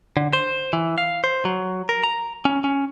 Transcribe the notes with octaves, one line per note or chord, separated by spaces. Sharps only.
D3
C5
E3
F5
C5
F#3
A#4
A#5
C#4
C#4